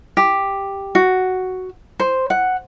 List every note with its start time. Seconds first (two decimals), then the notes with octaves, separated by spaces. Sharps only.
0.17 G4
0.95 F#4
2.00 C5
2.30 F#5